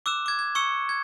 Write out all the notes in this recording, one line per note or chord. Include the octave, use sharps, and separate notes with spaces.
D6 E6 F#6 E7
D6 G#6
G#6
C#6 E6 C#7
G#6